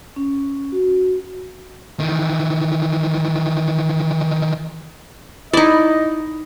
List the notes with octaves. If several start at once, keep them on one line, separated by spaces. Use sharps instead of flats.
C#4
F#4
D#3 E3
D#4 E4 D5 D#5